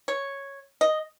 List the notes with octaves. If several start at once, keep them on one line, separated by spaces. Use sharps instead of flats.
C#5
D#5